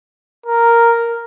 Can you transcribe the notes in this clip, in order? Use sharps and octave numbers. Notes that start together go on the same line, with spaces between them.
A#4